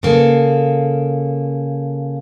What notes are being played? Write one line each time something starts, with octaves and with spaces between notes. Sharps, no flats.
C#3 A#3 A4